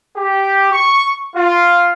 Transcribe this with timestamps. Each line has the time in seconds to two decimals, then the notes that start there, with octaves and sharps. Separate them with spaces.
0.17 G4
0.72 C#6
1.35 F4